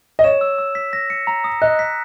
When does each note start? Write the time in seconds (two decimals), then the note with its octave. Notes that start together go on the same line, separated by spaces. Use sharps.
0.19 D#5
0.24 C#5 E7
0.41 E6
0.58 E6
0.75 B6
0.93 A#6
1.10 C#7
1.27 A#5
1.44 D#6
1.62 D#5 F#6
1.79 B6